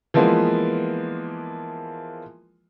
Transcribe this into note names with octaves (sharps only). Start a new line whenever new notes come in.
E3 F3 G#3 A#3 B3